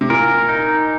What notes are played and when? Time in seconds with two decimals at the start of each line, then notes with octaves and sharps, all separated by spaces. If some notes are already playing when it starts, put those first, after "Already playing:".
0.01 C3
0.10 A#2 A#4
0.49 D#4